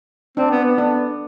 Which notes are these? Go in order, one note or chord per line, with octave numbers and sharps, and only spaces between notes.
C4 D4
B3
B3
D4